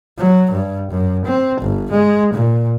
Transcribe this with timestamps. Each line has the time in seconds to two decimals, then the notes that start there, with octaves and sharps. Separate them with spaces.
0.18 F#3
0.51 G2
0.91 F#2
1.25 C4
1.61 G1
1.91 G#3
2.34 A#2